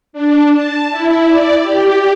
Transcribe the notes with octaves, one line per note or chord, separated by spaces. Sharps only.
D4
A5
E4
D5
G4